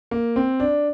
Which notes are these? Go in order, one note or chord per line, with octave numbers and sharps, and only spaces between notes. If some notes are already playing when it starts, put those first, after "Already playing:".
A#3
C4
D4